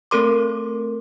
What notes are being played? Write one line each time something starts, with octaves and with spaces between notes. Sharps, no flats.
A3 C4 A4 A#4 C6 D6